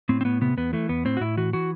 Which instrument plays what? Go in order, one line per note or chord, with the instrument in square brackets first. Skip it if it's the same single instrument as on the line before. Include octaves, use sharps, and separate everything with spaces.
[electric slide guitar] A2 C4
C4
A2 B3
C3 B3
E2 B3
E3 A3
E2 B3
A2 C4
F#4
A2 E4
E3 F#4
E3 F#4